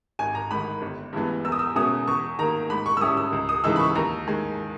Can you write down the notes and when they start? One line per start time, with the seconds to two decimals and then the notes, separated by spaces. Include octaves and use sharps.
0.19 G#1 G#5
0.35 A#5
0.51 G#2 D#3 B5
0.82 G1
1.13 G2 E3 G#3 B3
1.45 E2 E6
1.52 D#6
1.59 E6
1.75 B2 G#3 C#4 E4 D#6
2.08 E2 C#6
2.39 D#3 A#3 A#5
2.70 G#2 B5
2.86 C#6
2.97 E6
3.01 G3 C#4 E4 D#6
3.17 E6
3.33 C#2
3.49 D#6
3.64 C#3 E3 G#3 D#4 E6
3.76 B5
3.79 C#6
3.95 D#2 A#5
4.27 D#3 G#3